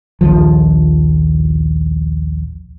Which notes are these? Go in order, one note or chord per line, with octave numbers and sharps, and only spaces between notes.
A#1 D#2 F3